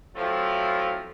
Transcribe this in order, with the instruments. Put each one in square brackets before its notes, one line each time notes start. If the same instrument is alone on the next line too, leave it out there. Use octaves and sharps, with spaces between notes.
[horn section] F3 F#3 A3 C4 E4 F4